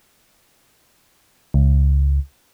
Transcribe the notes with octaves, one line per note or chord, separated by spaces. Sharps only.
C#2